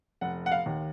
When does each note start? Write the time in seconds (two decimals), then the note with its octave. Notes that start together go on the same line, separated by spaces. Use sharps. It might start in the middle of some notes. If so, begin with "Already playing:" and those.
0.21 F1 F#5
0.46 F#5
0.52 F5
0.66 D#2 D#3